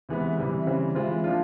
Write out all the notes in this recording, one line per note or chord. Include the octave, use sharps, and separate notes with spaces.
C3 E3 G#3 B3
C3 E3 G3
C#3 E3 G3 C4
E3 G#3 C4 F4
F3 A#3 D4 F4